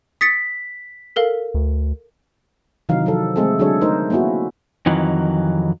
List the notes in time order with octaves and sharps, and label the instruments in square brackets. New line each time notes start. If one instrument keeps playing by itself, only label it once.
[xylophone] D#6 A6 C#7 [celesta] B6
[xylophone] A4 A#4 F5
[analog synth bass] D2
[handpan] C3 D#3 E3 F#3 D#4 F5
F3 F#3 A4
G#3 A3 C4 G#4 A4
D3 F#3 D4 G#4 A4 C#5
A3 D#4 A#4 C5
A#3 B3 C#4 E4 F#4
[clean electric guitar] F2 D#3 E3 F#3